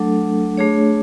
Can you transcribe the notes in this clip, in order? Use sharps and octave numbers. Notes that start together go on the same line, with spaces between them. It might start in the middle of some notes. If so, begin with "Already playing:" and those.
Already playing: F#3 A3 D4 A4
A3 D4 G#4 C#5